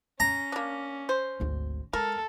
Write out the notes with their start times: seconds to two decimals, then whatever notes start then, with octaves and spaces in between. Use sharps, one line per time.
0.20 C#4 A#5
0.52 A#3 D4
1.09 C5
1.40 G#1 D2
1.93 G#3 A4 A#4